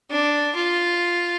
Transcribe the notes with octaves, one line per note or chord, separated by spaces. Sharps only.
D4
F4